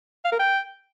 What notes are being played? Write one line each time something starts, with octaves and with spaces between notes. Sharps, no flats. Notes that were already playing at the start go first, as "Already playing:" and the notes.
F5
A#4
G5